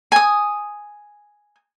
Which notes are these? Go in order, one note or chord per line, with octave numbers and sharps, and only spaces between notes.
G#5 D#6